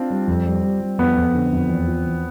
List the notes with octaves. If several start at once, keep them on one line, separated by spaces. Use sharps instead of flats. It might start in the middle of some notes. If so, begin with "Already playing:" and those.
Already playing: C4 D4 F4
G3
F2
G3
G3
G3
F2 B3
F2
D3
F2
E2
F3
E2